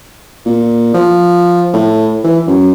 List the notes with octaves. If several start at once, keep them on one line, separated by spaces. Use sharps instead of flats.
A#2
F3
A2
E3
F#2